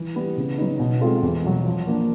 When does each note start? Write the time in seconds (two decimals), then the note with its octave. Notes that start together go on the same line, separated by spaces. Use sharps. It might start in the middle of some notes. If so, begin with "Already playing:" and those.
Already playing: E3
0.15 G3 B3 E4
0.37 C#3
0.58 F#3 B3 D#4
0.80 B2
1.01 G#3 C4 F4 A4
1.23 E2
1.44 B2 F#3
1.66 F3
1.87 A#3 D4